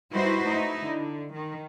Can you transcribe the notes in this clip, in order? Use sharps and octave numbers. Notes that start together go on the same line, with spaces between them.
G3 D#4 E4 F#4 B4 C5
A3 D#4 E4
D3
D#3